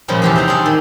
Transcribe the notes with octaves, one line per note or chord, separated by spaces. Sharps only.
A#2 C#3 F3 G3 G#3
E2 C3 G4 E5 F5 A5
C4 D#4 C5 D5 F5 A#5
C4 D4 G#4 A4 D5 A5
D#3